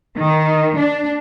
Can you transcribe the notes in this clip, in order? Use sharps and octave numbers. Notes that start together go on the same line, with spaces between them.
D#3
D4